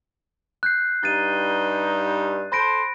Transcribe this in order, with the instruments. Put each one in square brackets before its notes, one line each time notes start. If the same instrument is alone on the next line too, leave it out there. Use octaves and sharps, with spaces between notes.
[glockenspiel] F#6 G6 C7
[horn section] G2 D#4 [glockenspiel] A6 D#7
[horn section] A4 C5 [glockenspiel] B5 A#6 D7